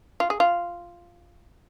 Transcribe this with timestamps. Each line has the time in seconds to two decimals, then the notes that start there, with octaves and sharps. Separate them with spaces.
0.20 F4
0.30 G#4
0.40 F4